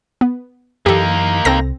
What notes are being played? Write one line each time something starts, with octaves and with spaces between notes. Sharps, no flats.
B3
F#2 E3 A#3 D#4 G4 A4
C2 C4 A4 A#6